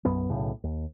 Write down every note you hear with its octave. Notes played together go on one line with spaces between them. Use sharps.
B1 F#2 B3
B1 A2 C#3
D#2